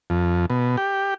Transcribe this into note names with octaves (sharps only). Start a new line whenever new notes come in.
F2
B2
G4